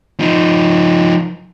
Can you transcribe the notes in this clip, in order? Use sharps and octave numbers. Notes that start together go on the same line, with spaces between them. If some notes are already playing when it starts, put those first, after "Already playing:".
F3 D#4